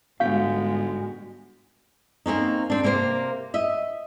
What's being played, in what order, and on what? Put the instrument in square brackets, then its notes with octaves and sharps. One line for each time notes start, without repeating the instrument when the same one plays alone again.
[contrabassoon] G1 [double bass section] G#2 G#3 [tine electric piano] F#4 G6 B6 [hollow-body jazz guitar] F5
[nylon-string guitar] A#3 C4 C#4 D#4
C4 D4
C3 A#3 G4 C5
D#5 E5